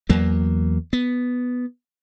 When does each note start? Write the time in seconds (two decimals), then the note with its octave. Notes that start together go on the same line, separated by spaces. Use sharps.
0.09 E2 F#3 A#3
0.93 B3